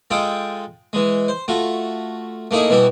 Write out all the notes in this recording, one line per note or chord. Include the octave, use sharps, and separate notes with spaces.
G#3 F4 A4 G5 D#6
E3 G#3
C5
A3 F4 F#4
A3 A#3 D#4 E4 G#4
B2 E3 G3 E4